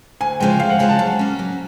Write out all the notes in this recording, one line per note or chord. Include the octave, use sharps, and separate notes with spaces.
D2 G#5
C#3 F3 G#3 B3 G5
D2 F5
F#5
C#3 F3 G#3 B3 G#5
A5
F#3
A#3 C#4
F#3